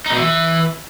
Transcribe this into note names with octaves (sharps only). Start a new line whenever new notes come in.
D#4
B2
E3